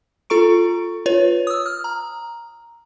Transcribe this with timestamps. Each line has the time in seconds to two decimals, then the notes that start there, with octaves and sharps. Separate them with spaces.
0.30 F4 A4 A#5 C#6 D7
1.06 F4 B4 C#5
1.47 D#6 E6
1.66 F6
1.84 A#5